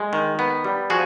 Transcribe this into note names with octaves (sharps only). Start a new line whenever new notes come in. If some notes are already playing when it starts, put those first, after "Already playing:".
Already playing: G#3
D#3
B3
G3
F3 F#4 G#4